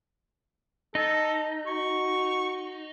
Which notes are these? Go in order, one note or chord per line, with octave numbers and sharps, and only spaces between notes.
D#4 A4
F#4 C#6